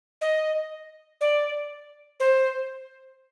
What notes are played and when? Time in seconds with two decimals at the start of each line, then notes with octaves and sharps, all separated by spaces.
0.21 D#5
1.21 D5
2.20 C5